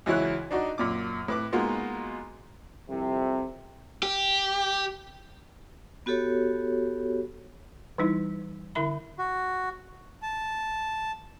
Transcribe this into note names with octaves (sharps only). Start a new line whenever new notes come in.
C#2 E3 F#3 E4 C#5 F#6
D4 D#4 F#4 D5 D#5
F#2 A#2 D6
A2 B4 D6
G#3 A#3 B3 D#4 F4 F#4
C2 F2 C3
G4
B3 F#4 G4 A4 C#5
E3 G3 D#4 E4
D3 E4 A#4 E5 B5
F#4
A5